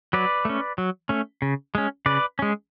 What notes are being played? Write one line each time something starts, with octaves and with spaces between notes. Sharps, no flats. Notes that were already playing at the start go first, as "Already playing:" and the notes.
F#3 B4 D5
A3 C#4
F#3
A3 C#4
C#3
G#3 C#4
C#3 B4 D5
G#3 C#4